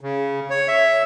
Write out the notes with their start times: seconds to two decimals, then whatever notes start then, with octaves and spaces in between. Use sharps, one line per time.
0.01 C#3
0.50 C#5
0.68 E5